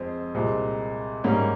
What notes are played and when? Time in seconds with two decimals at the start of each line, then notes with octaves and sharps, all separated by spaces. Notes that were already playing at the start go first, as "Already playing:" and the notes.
Already playing: F2 G#3 C4 C5
0.34 C2 A#2 G#3 C4
1.24 G#2 G3 A#3 C#4